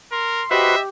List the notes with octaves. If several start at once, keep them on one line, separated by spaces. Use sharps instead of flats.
A#4 C6
F#4 G4 B4 C5 D#5 E5